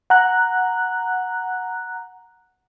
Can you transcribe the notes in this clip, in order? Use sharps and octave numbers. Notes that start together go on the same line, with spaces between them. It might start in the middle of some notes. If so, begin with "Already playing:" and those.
F#5 A#5 F#6